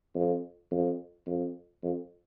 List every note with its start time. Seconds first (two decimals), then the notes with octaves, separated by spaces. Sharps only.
0.15 F2
0.71 F2
1.27 F2
1.83 F2